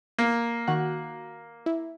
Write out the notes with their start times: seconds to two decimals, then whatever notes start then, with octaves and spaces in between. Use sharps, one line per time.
0.18 A#3
0.67 D#3 F#4 F#6
1.66 E4